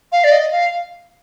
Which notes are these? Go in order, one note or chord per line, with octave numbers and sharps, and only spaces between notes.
F5
D5
D#5
F5